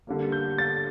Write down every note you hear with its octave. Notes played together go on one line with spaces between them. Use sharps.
D3 G3 A#3
G6
A6